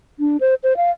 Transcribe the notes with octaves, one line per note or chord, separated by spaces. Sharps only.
D4
C5
C5
F5